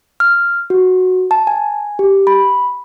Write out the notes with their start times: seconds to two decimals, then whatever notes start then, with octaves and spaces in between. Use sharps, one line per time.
0.20 F6
0.70 F#4
1.31 A5
1.47 G#5
1.99 G4
2.27 B5